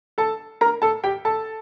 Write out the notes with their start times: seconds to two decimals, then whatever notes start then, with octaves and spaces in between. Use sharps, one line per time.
0.18 A4 A5
0.61 A#4 A#5
0.82 A4 A5
1.04 G4 G5
1.25 A4 A5